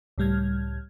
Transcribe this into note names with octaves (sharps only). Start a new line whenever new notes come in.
C#2 A2 G3 F6 G#6